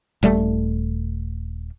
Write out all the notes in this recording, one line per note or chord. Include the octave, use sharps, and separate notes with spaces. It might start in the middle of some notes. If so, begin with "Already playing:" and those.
D#1 G3 A3